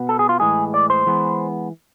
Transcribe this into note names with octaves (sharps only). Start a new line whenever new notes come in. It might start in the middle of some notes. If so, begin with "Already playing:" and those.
Already playing: B2 B3
A4
G#4
F4
A2 E3 G#3 G#4
D5
C5
E3 G#3 B3